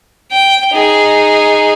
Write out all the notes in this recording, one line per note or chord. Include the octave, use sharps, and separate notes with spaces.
G5
D#4 G#4